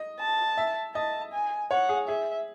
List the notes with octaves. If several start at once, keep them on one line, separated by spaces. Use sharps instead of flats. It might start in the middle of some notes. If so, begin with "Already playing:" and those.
Already playing: D#5
A5
E5
D#5 A5
G#5
C#5 F#5
G#4
G#4 E5